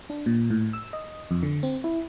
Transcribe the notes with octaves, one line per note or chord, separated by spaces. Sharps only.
D4
A#2
A2
E6
D#5
F2
D3
C4
E4